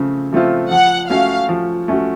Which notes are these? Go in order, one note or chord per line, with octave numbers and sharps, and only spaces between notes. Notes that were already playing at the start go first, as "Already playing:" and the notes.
Already playing: C#3 F3 A3 C4
F3 A3 C4 F4
F3 F#5
A3 C#4 F#4 F5
F3
A3 C#4 F#4